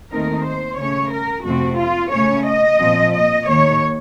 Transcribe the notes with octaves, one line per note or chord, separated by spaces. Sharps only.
D#2 D#3 A3 C4 D#4 A#4
C5
C#3 A3 C#4 C#5
A#4
F2 C3 F3 A3 C4 F#4
F4
C#3 A3 C#4 C#5
D#5
A#2 F3 C4
D#5
D#2 D#3 A#3 C#5